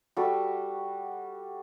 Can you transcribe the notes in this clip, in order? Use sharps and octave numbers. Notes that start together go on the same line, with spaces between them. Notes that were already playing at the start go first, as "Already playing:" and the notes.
G3 F#4 A4